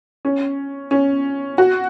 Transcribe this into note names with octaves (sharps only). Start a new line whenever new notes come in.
C#4
C#4
F#4